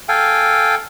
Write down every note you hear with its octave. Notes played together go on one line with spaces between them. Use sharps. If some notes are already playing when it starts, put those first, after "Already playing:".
A4 F5 G5 G#5